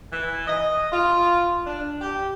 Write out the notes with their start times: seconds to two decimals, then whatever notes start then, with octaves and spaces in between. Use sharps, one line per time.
0.11 E3
0.47 D#5
0.91 F4
1.66 D4
2.00 G4